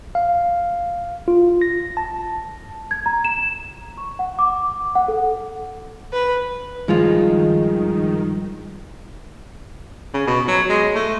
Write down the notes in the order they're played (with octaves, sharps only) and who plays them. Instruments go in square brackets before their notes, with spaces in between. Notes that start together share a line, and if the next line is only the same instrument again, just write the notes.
[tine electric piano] F5
F4
A#6
A5
[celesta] G#6
A#5
E7
C#6
F#5
D6
F#5
A4
[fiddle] B4
[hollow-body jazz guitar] G2 F3 F4 [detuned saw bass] D#3 [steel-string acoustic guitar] G#3
[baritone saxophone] C#3
B2
F#3
G#3
A3